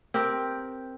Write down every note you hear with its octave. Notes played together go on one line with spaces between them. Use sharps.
C4 G4 A#4